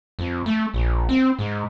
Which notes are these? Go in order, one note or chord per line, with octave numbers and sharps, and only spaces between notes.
F2
A3
A#1
C4
G#2